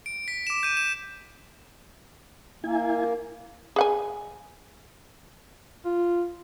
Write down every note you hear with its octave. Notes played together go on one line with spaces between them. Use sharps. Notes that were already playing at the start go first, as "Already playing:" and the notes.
D7
B6
D6 E7
G6 D#7
E7
A#3 E4 G#5
G#4 F#5 G#5
F4